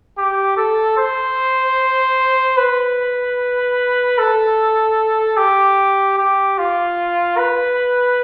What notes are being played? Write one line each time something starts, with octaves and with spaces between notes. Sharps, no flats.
G4
A4
C5
B4
A4
G4
G4
F4
B4